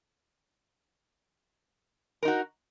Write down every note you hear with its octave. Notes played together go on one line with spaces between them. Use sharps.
D#4 F#4 A#4